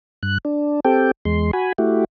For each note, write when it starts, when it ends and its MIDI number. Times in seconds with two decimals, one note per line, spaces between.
0.23 0.38 43
0.23 0.38 90
0.45 0.80 62
0.85 1.11 60
0.85 1.11 67
0.85 1.11 69
0.85 1.11 79
1.25 1.51 40
1.25 1.51 56
1.25 1.51 84
1.53 1.72 66
1.53 1.72 80
1.53 1.72 83
1.78 2.04 57
1.78 2.04 64
1.78 2.04 66
1.78 2.04 67